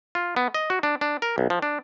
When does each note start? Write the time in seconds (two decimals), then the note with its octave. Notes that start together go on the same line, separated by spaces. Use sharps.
0.15 F4
0.36 B3
0.54 D#5
0.70 F#4
0.83 D4
1.01 D4
1.22 A#4
1.38 B1
1.50 F3
1.62 D4